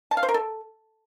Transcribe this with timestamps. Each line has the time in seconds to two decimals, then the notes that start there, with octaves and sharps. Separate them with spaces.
0.11 A5
0.17 F5
0.23 C5
0.29 A#4
0.34 A4